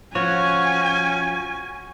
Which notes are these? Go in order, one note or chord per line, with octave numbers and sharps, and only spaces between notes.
F3 C#4 F#4 C#5 G#5